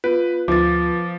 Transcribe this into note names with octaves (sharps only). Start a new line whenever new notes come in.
B3 F4 B4
D2 F3 B3 F4 D6 A6